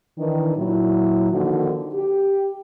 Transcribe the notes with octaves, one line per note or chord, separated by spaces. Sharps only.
D#3 E3 D4
A#2 F#3 E4
D3 D#3 F3 A#3 D#4 F#4
G4